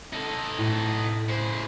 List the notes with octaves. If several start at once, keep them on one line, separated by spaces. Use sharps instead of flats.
D#4 A4
A2
C#3 C5